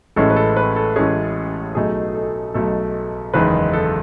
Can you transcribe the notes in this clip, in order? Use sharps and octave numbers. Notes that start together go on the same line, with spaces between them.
A1 A2 G#3 C#4 A4
B4
A4
B4
A4
A1 A2 G#3 C#4 G#4
B1 B2 A3 D#4 G#4
A4
B1 B2 A3 D#4 A4
F#1 E2 D#3 G#3 B4
A4